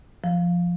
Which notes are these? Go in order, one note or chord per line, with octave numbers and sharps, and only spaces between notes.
F3